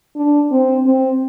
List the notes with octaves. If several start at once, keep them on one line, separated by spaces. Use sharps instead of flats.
D4
C4
C4